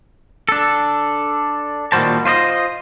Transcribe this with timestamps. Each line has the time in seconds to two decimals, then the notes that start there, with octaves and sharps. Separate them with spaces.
0.49 D4 A4
1.92 A#2 D#3 G3 F#4 C5 A5
2.25 F4 C5 D5 D#5